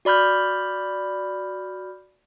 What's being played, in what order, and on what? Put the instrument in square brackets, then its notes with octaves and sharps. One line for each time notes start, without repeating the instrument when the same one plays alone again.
[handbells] F#4 D5 B5 F6 G6